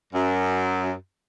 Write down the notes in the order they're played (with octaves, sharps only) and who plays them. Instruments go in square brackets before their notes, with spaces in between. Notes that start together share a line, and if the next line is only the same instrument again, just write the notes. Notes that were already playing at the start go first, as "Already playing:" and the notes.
[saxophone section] F#2